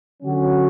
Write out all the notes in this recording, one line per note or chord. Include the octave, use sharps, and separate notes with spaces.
D3 F#3 C#4 F#4